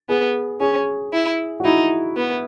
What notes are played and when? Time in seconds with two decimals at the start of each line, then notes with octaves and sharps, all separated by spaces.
0.09 B3 G#4
0.60 C#4 G#4
1.13 E4
1.60 F#4
1.65 D#4 E4
2.17 B3